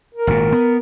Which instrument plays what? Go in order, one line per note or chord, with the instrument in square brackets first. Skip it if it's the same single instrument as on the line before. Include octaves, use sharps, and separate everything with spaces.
[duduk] A#4
[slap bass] G#1 A#2
B3